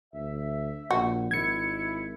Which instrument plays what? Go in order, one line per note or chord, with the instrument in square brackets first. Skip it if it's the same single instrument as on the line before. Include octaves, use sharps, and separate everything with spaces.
[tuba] D2 [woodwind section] E5
[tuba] A#1 [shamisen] F#4
[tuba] G#1 [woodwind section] E4 [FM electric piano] G#6 C#7